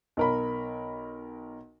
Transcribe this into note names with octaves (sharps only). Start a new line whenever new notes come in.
B1 A#4 B5